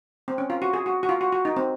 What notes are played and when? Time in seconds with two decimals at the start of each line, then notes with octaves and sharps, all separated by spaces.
0.28 C4
0.38 C#4
0.50 F4
0.62 F#4
0.73 G#4
0.86 F#4
1.03 F#4
1.09 F4
1.21 F#4
1.33 F#4
1.45 D#4
1.57 C4